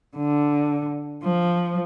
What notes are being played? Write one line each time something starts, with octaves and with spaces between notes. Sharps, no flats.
D3
F3